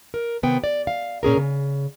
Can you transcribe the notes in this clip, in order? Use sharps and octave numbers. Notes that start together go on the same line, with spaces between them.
A#4
C3 D#3 B3 G5
D5
F5
A#2 C#4 G#4 A#4
C#3